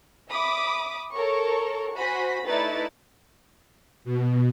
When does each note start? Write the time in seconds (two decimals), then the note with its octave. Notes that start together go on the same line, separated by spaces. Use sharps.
0.28 E5 B5 D6 D#6
1.14 A4 A#4 C#5 C#6
1.95 F#4 C5 G#5 B5 A#6 B6
2.45 A3 D#4 E4 B4 D5 A6
4.05 B2